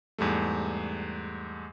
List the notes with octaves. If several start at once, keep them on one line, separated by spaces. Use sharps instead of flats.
E2 G#2 G3 A3